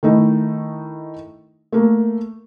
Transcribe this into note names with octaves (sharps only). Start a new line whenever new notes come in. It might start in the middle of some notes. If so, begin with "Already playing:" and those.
D#3 A3 D#4 E4
A3 A#3